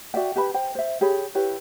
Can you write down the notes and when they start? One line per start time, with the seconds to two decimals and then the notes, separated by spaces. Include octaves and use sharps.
0.14 F#4 D5 E5 G5
0.36 G4 B4 A5 B5
0.54 C5 G5
0.75 C5 E5
1.01 G4 G#4 C#5 B5
1.35 E4 G4 B4 C#5